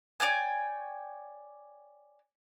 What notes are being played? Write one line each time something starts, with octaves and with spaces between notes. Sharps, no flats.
C#5 D5 G5 G#5